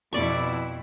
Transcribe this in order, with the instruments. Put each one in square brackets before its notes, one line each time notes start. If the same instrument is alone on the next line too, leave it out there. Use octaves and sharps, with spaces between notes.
[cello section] F2 B2 E4 [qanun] D5 C#6